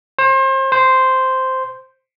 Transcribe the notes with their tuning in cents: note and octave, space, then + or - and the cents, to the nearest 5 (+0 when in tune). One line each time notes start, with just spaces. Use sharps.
C5 +35
C5 -5